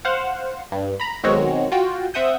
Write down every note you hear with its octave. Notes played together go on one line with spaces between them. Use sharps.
C5 F5 F#5
G2
A#5 B5
B1 D#3 G#3 C4 F#4 C#5
F4 F#4 G5
C4 E5 F#5 D#6 G6